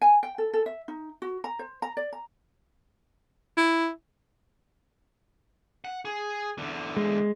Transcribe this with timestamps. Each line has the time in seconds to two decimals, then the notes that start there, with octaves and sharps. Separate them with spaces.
0.01 G#5
0.23 G5
0.38 A4
0.53 A4
0.66 E5
0.88 D#4
1.22 F#4
1.44 A#5
1.59 C5
1.82 A#5
1.97 D5
2.12 A#5
3.57 E4
5.85 F#5
6.05 G#4
6.58 E2 D3
6.97 G#3